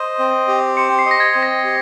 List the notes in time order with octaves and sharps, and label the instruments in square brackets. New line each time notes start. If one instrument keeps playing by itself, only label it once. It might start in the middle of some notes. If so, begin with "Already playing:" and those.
Already playing: [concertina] C5 D#5
C4
G4
[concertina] C5 [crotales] C#7
[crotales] C7
[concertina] D#5
[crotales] A#6
G#6
[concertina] C4
[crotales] A#6
[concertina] G4